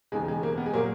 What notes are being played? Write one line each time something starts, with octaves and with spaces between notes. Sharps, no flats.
E1 D#2 C#3 G#3
G#3
A#3
B3
G#3
A#2 F#3 A#3